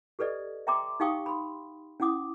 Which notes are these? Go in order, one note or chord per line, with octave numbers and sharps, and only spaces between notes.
G4 A4 B4 D5 D#5
E5 G5 A#5 C6 D6
D#4 G4 F5 G5 C#6 D#6
B5 C6
C#4 E4 F#5 D6 D#6